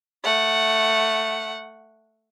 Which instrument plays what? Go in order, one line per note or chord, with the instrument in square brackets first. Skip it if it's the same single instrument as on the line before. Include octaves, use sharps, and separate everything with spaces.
[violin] A3 F#5